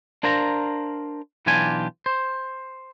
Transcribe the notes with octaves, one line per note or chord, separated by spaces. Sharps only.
D4 A#4 C5 F5 A#5
B1 E3 D4 F4 G4 G#5
C5